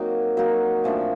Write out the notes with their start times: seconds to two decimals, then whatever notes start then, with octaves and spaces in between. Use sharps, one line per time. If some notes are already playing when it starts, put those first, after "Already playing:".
Already playing: F#3 A#3 C4 D#4 F#4
0.37 F#3 A#3 D#4 F#4
0.84 A#2 F3 A3 D4